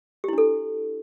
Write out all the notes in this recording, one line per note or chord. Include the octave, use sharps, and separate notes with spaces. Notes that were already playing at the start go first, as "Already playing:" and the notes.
D4 E4 G4 A4